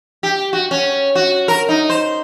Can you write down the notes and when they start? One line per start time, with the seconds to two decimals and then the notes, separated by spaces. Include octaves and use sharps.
0.23 G4
0.53 F#4
0.71 C#4
1.15 F#4
1.48 A#4
1.69 D#4
1.90 C5